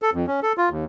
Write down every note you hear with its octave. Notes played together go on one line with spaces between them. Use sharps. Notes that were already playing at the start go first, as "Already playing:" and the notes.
A4
F2
C#4
A4
F4
D#2